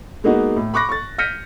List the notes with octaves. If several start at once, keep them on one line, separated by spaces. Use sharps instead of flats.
G#3 A#3 B3 D#4 F#4
A2
B5 C#6 D6 F#6 A#6
C#6 A6
F6 G6 A#6 B6 C#7 D#7